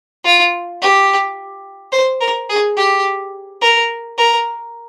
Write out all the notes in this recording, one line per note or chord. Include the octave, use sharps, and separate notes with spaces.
F4
G4
C5
A#4
G#4
G4
A#4
A#4